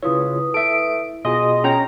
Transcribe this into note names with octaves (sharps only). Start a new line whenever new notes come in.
C#3 E4 F4 B4 C#5 D#6
A4 E5 D7
B2 F4 G#4 D#5 C6
C#4 C#5 G5 A#5